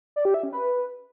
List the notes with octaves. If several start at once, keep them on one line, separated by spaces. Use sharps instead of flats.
D5
G4
E5
C#4
B4